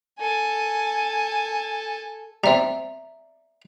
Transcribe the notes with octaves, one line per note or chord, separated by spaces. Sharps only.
A4 G#5
G3 C4 D5 E5 A#5